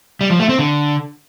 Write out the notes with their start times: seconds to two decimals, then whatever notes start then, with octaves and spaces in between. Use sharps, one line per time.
0.21 G3
0.30 F3
0.40 A3
0.49 C4
0.59 D3